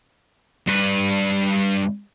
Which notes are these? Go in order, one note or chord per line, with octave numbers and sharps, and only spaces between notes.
G2 B4